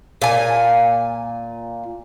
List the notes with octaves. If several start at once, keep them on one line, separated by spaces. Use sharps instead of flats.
A#2 G#5